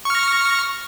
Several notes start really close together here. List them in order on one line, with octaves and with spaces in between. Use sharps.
C#6 F6 A#6